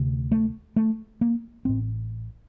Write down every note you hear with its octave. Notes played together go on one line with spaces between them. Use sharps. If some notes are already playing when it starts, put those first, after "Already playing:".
Already playing: D2 C3
A3
A3
A#3
A1 A2 C4